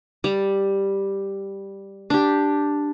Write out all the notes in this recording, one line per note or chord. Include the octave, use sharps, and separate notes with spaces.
G3
D4 G4